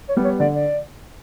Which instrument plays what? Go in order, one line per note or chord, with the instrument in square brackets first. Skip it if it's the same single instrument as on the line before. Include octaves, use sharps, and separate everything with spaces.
[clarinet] C#5
[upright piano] G3 B3
[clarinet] C#5
[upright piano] D3 [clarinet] D5
[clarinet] D5